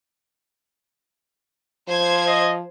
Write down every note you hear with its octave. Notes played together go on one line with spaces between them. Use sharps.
F3 C5 G#6
D#5